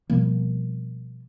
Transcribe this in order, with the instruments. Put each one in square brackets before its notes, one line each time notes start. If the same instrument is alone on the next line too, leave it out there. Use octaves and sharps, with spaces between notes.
[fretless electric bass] B2 F3 G3 A#3